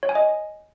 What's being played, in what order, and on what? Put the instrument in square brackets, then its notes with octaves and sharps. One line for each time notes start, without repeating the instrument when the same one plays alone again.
[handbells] C#5
G#5
D#5